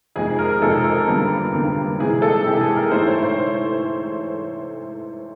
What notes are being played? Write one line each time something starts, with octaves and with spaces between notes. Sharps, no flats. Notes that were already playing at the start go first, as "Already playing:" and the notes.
F2 C3 D#3 G#3 G#4
A#4
F2 C3 D#3 G#3 A4
A#4
G2 D3 G3 A#3
G2 D3 G3 A#3
C3 E3 G#3 G#4
A4
C3 E3 G#3 G4
G#4
A#4
G#2 E3 A3 C5
C#5
C5